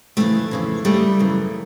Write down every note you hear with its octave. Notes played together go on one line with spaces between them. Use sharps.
F2 C#3 E3 G3 A3
F2 C#3 E3
F#2 C#3 E3 G3 A3
F#2 C#3 E3